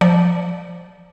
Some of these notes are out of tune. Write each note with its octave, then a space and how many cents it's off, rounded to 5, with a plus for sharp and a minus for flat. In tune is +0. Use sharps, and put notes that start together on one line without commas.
F3 +0 D5 -15